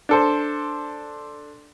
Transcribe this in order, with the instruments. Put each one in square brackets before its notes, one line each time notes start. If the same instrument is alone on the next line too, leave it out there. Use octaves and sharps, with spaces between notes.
[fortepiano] D4 A4 C5